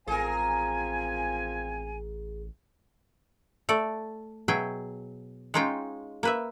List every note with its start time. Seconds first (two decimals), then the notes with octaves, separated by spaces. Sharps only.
0.08 A1 F3 C4 G#4 A#4 G#5
3.69 A3 A4 D5
4.48 B2 F#3 G#4 E5 G5
5.54 G#3 C#4 D#4 F4 G5
6.23 A#3 B4 E5